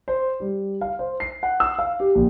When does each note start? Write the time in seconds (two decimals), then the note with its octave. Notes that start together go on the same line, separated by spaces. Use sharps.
0.08 C5
0.40 G3
0.81 F5
0.99 C5
1.20 C7
1.43 F#5
1.60 E6
1.79 F5
2.00 G4
2.15 A#1